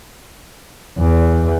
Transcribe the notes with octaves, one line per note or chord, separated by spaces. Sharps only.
E2